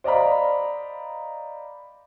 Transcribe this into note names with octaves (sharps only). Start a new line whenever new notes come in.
C5 D5 D#5 F5 A#5 B5